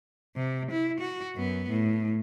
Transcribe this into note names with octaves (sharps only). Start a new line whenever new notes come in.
C3
E4
F#4
F#2 B3
A2